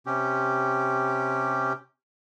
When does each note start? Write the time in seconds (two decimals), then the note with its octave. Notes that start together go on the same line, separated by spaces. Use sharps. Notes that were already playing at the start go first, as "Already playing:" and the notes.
0.06 C3 C#4 G4